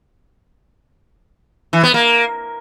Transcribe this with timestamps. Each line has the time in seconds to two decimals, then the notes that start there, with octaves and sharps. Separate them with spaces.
1.73 E3
1.83 B3
1.94 A#3